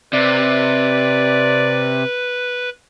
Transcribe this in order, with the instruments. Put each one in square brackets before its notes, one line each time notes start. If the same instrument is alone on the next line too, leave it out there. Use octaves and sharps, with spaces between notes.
[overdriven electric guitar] C3 [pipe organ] B4 [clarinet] D5